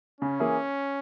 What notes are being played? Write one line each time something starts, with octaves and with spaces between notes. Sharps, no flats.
C#3 C#4
E3 A#3 E4 G#4